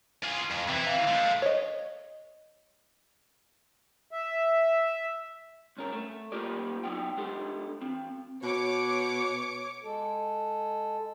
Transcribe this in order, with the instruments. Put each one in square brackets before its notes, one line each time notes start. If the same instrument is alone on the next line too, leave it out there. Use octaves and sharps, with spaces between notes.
[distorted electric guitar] F4 G#4
F2
[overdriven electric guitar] C3 [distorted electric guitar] E3
[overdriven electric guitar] F5
[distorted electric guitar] G#3 A3
[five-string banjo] C#5 D#5
[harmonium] E5
[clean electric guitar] C2 C#4 A#4
A3
A#3 F4 G4 A#4 D5
F#3 B3 D#4 F#5 G5
G#3 D4 G4 A4
E3 C4
[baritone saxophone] B2 [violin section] C#5 D6 C#7
[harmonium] G#3 A4